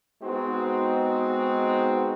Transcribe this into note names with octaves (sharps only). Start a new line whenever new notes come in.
G#3 B3 C4 D#4 F#4